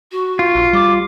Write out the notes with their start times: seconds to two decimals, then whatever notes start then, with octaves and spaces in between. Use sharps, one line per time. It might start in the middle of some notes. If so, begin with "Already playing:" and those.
0.11 F#4
0.39 F4
0.55 A#1
0.73 G3 D6